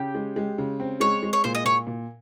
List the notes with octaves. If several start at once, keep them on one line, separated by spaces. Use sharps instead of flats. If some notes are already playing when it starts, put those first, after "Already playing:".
Already playing: C#3 G4
G#3
G#3
C#3
C4
G#3 C#5
G#3
C#5
A#2 C5
D#5
A#2 C#5
A#2